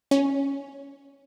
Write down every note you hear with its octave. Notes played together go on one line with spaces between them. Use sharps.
C#4